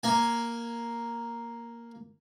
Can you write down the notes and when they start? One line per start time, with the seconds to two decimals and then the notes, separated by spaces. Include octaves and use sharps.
0.03 A#3 G#5